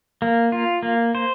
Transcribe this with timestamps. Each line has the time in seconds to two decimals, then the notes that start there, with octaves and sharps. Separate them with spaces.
0.22 A#3
0.52 F4
0.83 A#3
1.15 C5